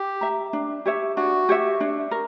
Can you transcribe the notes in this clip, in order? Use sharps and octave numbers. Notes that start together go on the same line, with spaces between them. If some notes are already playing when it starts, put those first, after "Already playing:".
Already playing: G4
E5 A#5
D4
G4 C#5 E5
D4 F#4
G4 C#5 E5
D4
A#4